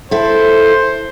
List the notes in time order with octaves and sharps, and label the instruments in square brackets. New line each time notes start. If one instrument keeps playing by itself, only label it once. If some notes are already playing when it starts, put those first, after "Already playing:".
[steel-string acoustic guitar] E4 A4 [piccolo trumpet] C5